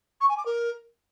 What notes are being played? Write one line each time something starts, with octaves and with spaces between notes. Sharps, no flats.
C#6
G#5
D6
A#4